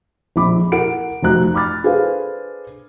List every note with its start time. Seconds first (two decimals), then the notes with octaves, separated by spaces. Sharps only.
0.36 A#1 F2 B5 D6
0.72 E4 A#4 F#5 D7
1.22 F1 F3 F#4 A#5 F#6
1.54 B5 D6 F6 A6
1.84 D4 G#4 A4 B4 C5 F5